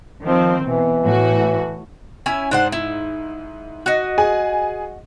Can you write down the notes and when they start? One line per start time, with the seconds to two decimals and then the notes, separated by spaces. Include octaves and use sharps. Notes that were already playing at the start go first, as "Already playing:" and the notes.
0.23 D#3 F3 C4
0.64 B2 E3
1.03 A2 F#4
2.26 C#4 E4 G#5
2.51 G#2 D4 C5 F#5
2.72 E4
3.86 F#4 D#5
4.18 G#4 G#5